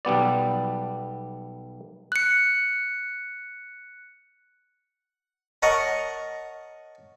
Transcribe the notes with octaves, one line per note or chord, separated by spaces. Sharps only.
B1 G3 B3 D5
F#6 C#7
A#4 C#5 D#5 F#5 A5